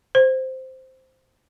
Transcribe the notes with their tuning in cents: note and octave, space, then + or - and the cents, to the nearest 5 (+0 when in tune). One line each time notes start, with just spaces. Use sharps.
C5 -5